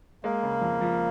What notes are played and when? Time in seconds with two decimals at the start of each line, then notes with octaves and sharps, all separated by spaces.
0.24 G#3 A#3
0.43 C#3
0.62 F2
0.81 F3